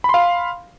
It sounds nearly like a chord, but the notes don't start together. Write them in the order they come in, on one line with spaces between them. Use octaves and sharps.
B5 C6 F5